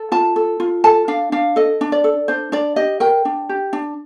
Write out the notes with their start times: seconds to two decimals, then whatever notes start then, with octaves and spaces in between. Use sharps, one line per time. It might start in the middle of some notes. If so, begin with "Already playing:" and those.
Already playing: A4
0.12 F4 A5
0.36 A4
0.60 F4
0.84 A4 A5
1.08 D4 F5
1.32 D4 F5
1.56 A4 D#5
1.81 D4
1.92 D5
2.04 A4
2.28 D4 C5
2.52 D4 D5
2.76 G4 D#5
3.00 A#4 G5
3.25 D4
3.49 G4
3.73 D4